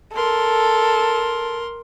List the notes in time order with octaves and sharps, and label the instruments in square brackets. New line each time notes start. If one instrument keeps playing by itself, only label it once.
[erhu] A4 [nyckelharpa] A#4 C6